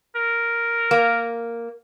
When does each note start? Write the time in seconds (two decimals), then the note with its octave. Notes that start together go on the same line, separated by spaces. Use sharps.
0.15 A#4
0.91 A#3